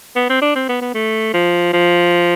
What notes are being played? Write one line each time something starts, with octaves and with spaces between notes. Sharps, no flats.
B3
C4
D4
C4
B3
B3
A3
F3
F3